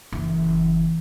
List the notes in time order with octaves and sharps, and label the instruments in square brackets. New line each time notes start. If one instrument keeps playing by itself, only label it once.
[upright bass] F#1 E3